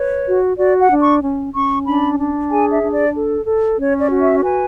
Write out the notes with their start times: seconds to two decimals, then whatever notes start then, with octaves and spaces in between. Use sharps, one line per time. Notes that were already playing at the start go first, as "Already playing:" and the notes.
Already playing: B4 C#5
0.26 F#4
0.58 F#4 D5
0.80 F#5
0.90 D4
1.01 C#6
1.22 C#4
1.54 C#4 C#6
1.87 D4 B5
2.18 D4
2.51 G#4 G#5
2.72 E5
2.83 D4
2.94 D5
3.15 A4
3.47 A4
3.78 C#4 C#5
4.00 D5
4.11 F#4
4.21 E5
4.43 B4 G#5